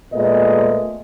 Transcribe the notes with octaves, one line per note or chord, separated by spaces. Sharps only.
A#2 G#3 A3 B3 D#5